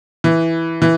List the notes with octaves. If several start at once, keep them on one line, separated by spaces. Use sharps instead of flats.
E3
E3